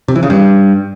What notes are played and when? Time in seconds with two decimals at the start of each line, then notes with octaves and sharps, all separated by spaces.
0.08 C3
0.16 E3
0.23 C#3
0.30 G2